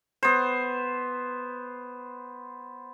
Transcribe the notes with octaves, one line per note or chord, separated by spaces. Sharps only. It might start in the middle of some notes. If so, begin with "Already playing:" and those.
B3 C5